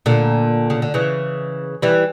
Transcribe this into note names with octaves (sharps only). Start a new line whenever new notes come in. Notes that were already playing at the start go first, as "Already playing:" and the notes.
A#2 D3
C#3
D3
C#3 E3
E3 G3